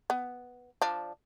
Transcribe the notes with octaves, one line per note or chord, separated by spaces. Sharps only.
B3
F3 D4